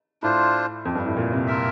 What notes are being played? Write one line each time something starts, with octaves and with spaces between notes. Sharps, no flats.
A2 D4 F4 C5
F2
G2
A2
A#2
C3
F4 A#4 E5